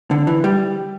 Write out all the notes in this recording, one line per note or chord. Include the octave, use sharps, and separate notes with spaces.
D3
E3
G3